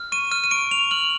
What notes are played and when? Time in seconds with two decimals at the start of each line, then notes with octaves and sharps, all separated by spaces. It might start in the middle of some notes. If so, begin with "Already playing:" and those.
Already playing: F6
0.12 C#6 D#7
0.31 F6 D#7
0.44 D#7
0.51 C#6 D7
0.71 C#6 F7
0.91 F6 F#7